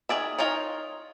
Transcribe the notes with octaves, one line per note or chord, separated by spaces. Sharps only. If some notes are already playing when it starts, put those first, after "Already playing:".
D#3 G#4 D5 E5
D#4 F4 A#4 C#5